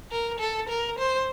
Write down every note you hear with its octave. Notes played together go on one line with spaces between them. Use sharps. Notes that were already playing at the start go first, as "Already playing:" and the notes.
A#4
A4
A#4
C5